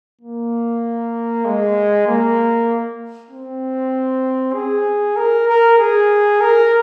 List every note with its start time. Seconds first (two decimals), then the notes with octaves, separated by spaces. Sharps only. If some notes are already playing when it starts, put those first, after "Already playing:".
0.21 A#3
1.45 G#3
2.07 A#3
3.31 C4
4.54 G#4
5.17 A#4
5.47 A#4
5.78 G#4
6.41 A#4